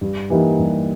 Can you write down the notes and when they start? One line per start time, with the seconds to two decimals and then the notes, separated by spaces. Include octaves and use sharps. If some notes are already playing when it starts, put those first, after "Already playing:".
0.01 G2
0.30 E3 G3 A#3 D#4
0.59 G2